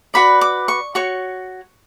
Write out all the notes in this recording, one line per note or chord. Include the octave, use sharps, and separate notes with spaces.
F#4 B4 D5 B5
D6
C#6
F#4 C#5 C#6